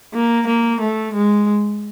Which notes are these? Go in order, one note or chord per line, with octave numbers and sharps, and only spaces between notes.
A#3
A#3
A3
G#3